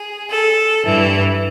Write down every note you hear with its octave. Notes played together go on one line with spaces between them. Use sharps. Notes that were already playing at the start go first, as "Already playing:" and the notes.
Already playing: G#4
A4
G2 E3